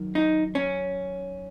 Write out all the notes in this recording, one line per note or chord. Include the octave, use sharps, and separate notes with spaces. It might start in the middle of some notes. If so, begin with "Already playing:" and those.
Already playing: F#2 D#3
D#4
C#4